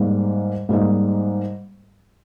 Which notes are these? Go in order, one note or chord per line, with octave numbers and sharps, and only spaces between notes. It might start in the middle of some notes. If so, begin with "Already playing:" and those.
Already playing: G#2 G3 A#3 D#4
G#2 G3 A#3 D#4